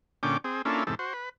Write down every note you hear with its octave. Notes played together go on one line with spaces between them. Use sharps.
A#2 D3 C#4 G5 D6
C4 G#4
A#3 C#4 D4 E4 F4 A4
E2 G#2 C3 A4
F#4 C5
B4